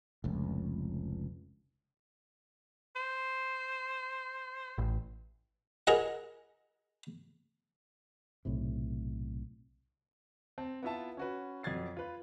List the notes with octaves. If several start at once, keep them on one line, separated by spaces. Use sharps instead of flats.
F1 C#2
C5
A1
G#4 A#4 D#5 F#5
B1 A2 C3
C4 A5
B3 E4 F4 E5 A5
C#4 F#4 B4
F2 F#3 G#6 A6 C7
F4 B4